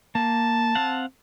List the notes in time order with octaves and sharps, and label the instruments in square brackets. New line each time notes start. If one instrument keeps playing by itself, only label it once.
[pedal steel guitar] A#3 [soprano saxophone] A5
[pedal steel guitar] C4 F5 F#5